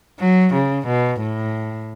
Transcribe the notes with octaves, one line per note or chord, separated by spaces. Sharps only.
F#3
C#3
B2
A2